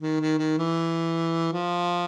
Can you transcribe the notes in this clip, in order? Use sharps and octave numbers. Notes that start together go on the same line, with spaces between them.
D#3
D#3
D#3
E3
F3